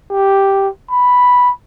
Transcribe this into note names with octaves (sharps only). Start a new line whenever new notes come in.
G4
B5